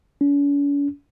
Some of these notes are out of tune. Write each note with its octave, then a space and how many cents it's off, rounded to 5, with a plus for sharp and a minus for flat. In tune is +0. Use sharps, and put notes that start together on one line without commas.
C#4 +45